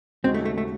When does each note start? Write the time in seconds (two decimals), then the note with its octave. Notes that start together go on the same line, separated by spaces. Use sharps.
0.24 D#2 C#3 G#3 C4 C#4 F#4
0.34 A3
0.45 A3
0.58 A3